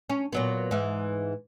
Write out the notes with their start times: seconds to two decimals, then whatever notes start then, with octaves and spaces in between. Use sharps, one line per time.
0.10 C#4
0.33 A#2 F#3 B3
0.71 G#2 E3